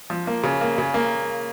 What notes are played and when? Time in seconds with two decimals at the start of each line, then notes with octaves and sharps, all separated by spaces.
0.10 F3
0.27 A#3
0.44 C#3
0.61 A#3
0.78 C#3
0.94 A#3